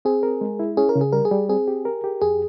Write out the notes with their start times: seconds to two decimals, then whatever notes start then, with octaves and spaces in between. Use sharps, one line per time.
0.05 C4 G#4
0.23 A#4
0.41 G#3
0.59 E4
0.77 C#4 G#4
0.89 A#4
0.95 C#3
1.01 G#4
1.13 G3 A#4
1.25 G#4
1.31 G3
1.49 C4 G#4
1.68 G4
1.85 A#4
2.04 G4
2.22 F2 G#4